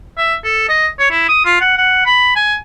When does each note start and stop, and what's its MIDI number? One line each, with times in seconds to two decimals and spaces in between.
0.18 0.35 76
0.44 0.65 69
0.69 0.87 75
0.99 1.08 73
1.11 1.26 64
1.29 1.45 87
1.45 1.59 65
1.61 1.77 78
1.78 2.05 78
2.06 2.35 83
2.36 2.55 80